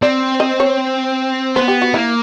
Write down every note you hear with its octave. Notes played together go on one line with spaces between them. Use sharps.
C4 D5
D#5
C#5
B3 C5
G4
F#4
A#3 E4